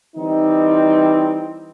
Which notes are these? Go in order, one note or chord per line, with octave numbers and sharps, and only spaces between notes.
E3 G3 C4 D#4